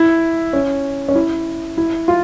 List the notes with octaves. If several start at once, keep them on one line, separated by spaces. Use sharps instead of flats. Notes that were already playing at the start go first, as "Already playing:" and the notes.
Already playing: E4
C#4
C#4
E4
E4
F4